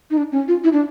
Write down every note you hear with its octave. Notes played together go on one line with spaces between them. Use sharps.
D#4
D4
C#4
F4
E4
D4